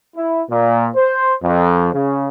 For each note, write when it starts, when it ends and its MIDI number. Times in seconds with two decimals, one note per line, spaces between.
0.16 0.42 64
0.50 0.89 46
0.96 1.34 72
1.43 1.90 41
1.93 2.28 49